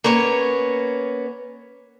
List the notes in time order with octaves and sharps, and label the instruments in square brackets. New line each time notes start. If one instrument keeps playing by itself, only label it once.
[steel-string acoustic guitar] A#3 B3 C#4 C#5